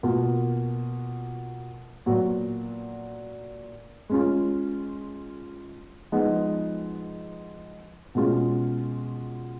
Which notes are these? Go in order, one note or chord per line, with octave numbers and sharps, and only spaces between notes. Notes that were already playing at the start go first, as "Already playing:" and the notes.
B2 A#3 F4
A#2 F#3 B3 F#4
G#3 C#4 F4
F3 G#3 B3 D#4
B2 G#3 C#4 F4